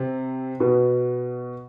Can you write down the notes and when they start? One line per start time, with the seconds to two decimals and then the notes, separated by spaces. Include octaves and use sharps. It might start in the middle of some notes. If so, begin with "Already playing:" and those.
Already playing: C3 C4
0.60 B2 B3